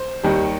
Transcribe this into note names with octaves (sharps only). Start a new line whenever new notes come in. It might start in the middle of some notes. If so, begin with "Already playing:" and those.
Already playing: C5
D#2 D#3 G3